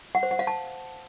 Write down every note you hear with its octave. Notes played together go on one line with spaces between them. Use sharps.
F#5
C5
F#5
F5
A5